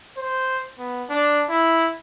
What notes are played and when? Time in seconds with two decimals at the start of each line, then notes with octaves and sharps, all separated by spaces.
0.17 C5
0.79 B3
1.10 D4
1.50 E4